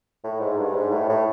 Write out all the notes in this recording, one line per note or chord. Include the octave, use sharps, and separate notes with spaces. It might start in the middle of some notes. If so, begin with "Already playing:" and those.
A2
G#2
G2
G#2
A2
A2